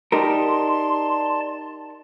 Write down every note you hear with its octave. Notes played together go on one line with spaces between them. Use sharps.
D#4 G4 A#4 D5 A5 C6